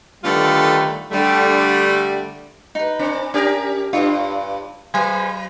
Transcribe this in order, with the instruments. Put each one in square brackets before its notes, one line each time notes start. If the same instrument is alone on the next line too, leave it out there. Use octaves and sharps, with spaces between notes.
[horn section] D3 D#3 G3 A3 B3 F4
D3 G3 A3
[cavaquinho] D#4 B4
[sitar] C4 D4
[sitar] C#4 G4 A#4 [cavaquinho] G#5
[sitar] G2 D4 [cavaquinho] F4 B4 C#5
[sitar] F#3 [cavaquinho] B4 C5 G#5